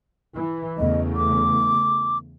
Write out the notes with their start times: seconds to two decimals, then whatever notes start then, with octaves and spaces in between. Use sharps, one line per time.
0.34 E3
0.78 E2 C#3 A3 D#5
1.15 D6